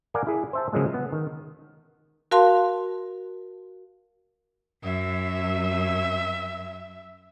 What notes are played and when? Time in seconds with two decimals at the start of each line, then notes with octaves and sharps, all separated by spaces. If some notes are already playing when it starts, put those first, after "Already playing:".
0.14 A#4 D5 F5 F#5 G#5
0.27 E4 G#4
0.53 C5 E5 A5
0.72 C#3 F3 F#3 G#3 A#3
0.94 B3
1.12 D#3
2.31 F#4 A#4 F5 A5 C6
4.83 F#2 E5